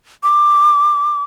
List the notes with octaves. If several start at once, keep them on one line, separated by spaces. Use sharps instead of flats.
D6